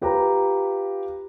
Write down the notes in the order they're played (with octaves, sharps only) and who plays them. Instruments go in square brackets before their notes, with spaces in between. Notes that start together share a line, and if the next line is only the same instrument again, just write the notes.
[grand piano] F4 G4 B4 A#5